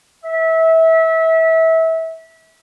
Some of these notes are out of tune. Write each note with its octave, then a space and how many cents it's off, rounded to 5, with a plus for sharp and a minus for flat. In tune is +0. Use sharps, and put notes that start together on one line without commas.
E5 -25